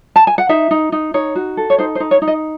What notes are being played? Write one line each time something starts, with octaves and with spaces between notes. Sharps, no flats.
A5
G#5
F#5
D#4 E5
D#4
D#4
D#4 C#5
F#4
A4
C#5
D#4 C5
C5
D#4
C#5
D#4
D#5